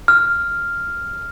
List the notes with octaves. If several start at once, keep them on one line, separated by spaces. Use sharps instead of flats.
F6